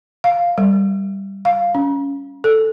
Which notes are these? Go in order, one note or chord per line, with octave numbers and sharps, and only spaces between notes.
F5
G3
F5
C#4
A4